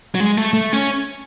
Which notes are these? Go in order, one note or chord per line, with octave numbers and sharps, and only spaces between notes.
F#3
G#3
A3
A3
C#4